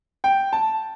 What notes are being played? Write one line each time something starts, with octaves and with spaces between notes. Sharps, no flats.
G5
A5